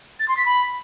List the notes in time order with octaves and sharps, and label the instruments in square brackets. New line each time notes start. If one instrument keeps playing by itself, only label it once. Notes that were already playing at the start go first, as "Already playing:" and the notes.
[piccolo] A6
C6
B6
B5